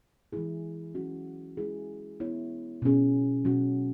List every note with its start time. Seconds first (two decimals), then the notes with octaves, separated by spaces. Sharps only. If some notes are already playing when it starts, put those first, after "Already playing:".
0.33 E3 G#3 E4 G#4
0.95 F#3 C#4 F#4
1.57 G#3 E4 G#4
2.20 B3 E4 C#5
2.82 B2 F#3 C#4 G#4
3.45 B2 F#3 C#4 F#4